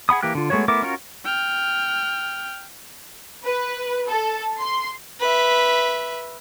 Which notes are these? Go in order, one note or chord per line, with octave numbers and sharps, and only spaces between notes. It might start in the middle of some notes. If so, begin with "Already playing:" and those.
G#4 F#5 B5 D#6
E3 A#3 G4 F#6
D3 F4
G#3 A3 B3 F#4 C#5
A3 B3 E4 A#4 D6
C#4 F4 F#4 A#4 C#5
G5 F6
B4
A4
C6
B4 E5